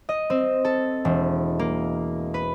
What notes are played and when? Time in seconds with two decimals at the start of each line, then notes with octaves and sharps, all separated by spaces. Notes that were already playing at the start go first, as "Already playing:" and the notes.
0.09 D#5
0.30 C4
0.65 A4
1.05 E1
1.59 A#3
2.34 B4